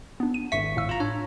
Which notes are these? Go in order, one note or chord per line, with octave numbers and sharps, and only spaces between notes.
B3 D4
D#7
G#1 E5 C#6 B6
A2 F5 E6
F4 A#5
D4 C#5